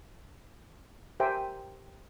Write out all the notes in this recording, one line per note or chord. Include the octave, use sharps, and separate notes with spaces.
G4 A#4 C5 E5 G5 G#5